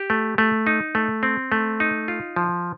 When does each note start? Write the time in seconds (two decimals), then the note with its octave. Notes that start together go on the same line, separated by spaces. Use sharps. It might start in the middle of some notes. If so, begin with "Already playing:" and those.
Already playing: G4
0.10 A3
0.38 A3
0.67 D#4
0.95 A3
1.23 C4
1.52 A3
1.80 D#4
2.08 F4
2.36 F3